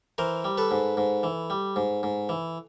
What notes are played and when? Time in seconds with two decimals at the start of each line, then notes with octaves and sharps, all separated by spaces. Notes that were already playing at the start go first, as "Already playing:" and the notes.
0.18 E3 A#4 C5
0.44 G3
0.58 A4 B4
0.71 G#2
0.97 G#2
1.23 E3
1.50 G3
1.76 G#2
2.03 G#2
2.29 E3